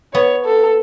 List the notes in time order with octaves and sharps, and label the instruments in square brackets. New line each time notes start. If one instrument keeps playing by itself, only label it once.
[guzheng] B3 [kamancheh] C#5
[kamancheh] A4